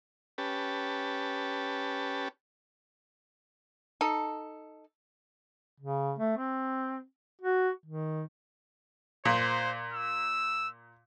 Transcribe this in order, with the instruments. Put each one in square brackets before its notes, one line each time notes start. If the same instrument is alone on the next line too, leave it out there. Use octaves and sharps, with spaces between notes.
[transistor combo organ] C#4 G4 B4 A5
[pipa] D#4 A4
[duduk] C#3
A3
C4
F#4
D#3
[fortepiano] A#2 [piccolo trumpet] C5
[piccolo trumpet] E6